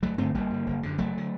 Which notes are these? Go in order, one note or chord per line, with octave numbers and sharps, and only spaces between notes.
G1 F#3 A3
G2 D3 A3 C4
G1 G3 A#3
G2 D3
F#1
F#2 D3
F#1 F#3 A3
D3